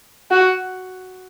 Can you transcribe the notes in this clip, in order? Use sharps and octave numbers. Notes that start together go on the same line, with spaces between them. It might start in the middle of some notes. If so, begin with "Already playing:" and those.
F#4